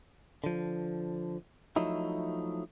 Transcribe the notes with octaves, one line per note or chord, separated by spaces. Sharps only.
D3 F3
F3 F#3 A3 D#4 E4